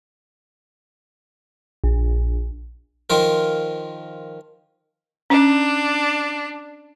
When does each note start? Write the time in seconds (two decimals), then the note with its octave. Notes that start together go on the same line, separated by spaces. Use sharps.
1.84 A#1
3.10 D#3 F3 F4 A#4
5.30 C#4 D4